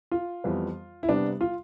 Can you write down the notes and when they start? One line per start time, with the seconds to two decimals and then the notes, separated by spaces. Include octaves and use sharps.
0.12 F4
0.44 F2 E3 G3 B3
1.03 E4
1.09 C3 G3 B3 D4
1.41 F4